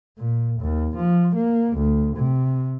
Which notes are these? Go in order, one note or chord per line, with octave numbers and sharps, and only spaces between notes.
A#2
D#2
F3
A#3
D2
C3